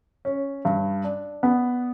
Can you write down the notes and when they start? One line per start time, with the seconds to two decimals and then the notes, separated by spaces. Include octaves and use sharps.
0.25 C#4
0.65 G2
1.04 D4
1.43 B3